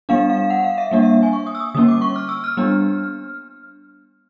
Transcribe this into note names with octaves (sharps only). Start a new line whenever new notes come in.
G3 B3 D4 F5
F5
F#5
F5
E5
G3 A#3 D4
E5
G#5
C#6
D#6
E6
D#6
D3 G3 A#3 C#4 D#6
D6
C#6
F6
E6
F6
G3 B3 D4